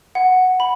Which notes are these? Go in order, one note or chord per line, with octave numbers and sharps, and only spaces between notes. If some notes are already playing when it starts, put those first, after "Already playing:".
F#5
B5